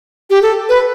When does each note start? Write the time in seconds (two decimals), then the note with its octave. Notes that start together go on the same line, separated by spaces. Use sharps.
0.30 G4
0.42 A4
0.69 B4